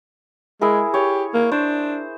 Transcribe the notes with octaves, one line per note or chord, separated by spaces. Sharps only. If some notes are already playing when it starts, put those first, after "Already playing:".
G#3 E4 G#4 A#4
G4 C#5
A#3
D4 C5